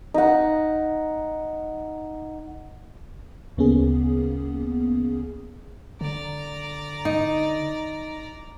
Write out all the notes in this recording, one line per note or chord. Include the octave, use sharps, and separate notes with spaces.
D#4 F#5
D2 C#3 A#3 B3 C#4 G#4
D3 D5 A#5
D#4